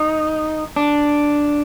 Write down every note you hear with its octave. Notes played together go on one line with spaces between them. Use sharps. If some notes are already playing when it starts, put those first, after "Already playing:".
Already playing: D#4
D4